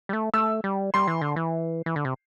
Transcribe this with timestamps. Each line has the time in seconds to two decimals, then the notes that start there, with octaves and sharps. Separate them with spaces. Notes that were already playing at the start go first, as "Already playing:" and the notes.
0.09 G3
0.13 A3
0.34 A3 E6
0.64 G3
0.94 G3 C6
1.07 E3
1.21 D3
1.36 E3
1.86 E3
1.96 D3
2.05 C3